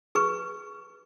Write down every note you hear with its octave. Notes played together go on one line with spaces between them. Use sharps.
G#4 B4 C#6